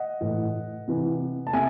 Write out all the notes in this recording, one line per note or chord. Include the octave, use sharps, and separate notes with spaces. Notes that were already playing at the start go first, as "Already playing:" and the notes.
Already playing: D#5 F#5
A2 E3
C3 E3
A5
C3 E5 G#5